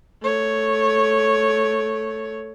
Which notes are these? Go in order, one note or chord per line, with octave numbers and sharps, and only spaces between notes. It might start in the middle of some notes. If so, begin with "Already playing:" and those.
A3 C#5